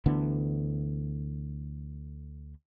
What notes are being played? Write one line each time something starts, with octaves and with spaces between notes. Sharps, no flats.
D2 D3 E3 B3